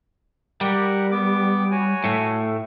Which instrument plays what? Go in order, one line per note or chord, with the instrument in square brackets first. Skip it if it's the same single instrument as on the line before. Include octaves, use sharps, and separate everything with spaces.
[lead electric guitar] G3 [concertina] G4 A#4 F#5
[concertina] B3 D6
F#4 C#5 G#5
[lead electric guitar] A2 A3